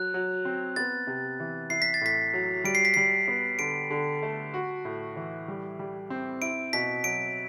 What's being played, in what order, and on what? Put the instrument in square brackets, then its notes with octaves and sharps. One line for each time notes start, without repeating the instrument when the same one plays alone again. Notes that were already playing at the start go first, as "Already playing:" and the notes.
Already playing: [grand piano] F#3 [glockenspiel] F#6
[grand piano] F#3
C4
[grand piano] B3 [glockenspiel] A6
[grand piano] C3
E3
[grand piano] E4 [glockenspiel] C7
[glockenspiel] B6
A6
[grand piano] A2 [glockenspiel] B6
[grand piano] F#3
[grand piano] G3 [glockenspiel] D7
[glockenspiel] C7
B6
[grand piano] G3 [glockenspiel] C7
[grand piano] B3
[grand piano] D3 [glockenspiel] D7
[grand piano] D3
A3
F#4
A2
E3
G3
G3
C4
[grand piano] E4 [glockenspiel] D7
[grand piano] B2 [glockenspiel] B6
[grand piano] F#3 [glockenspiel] D7